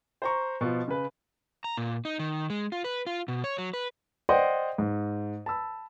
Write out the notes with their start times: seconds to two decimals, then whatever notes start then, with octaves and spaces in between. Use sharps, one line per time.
0.22 C5 A#5 C#6
0.61 B2 F3
0.88 C#3 B4
1.64 A#5
1.77 A#2
2.05 D#4
2.19 D#3
2.50 G#3
2.72 F4
2.84 B4
3.07 F4
3.28 B2
3.44 C#5
3.58 F#3
3.73 B4
4.29 C5 D5 D#5 F#5 G5 C6
4.78 G#2
5.46 A5 B5 E6